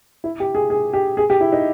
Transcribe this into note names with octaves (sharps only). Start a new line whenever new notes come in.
E4
G4
G#4
G#4
G4
G#4
G4
E4
D#4